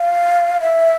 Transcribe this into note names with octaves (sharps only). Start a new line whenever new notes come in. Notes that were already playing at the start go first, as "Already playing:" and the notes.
Already playing: F5
E5